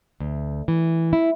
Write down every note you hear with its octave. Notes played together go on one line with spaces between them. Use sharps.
D2
E3
E4